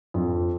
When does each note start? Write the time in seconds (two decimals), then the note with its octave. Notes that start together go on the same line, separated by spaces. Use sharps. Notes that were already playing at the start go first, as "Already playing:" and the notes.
0.14 F2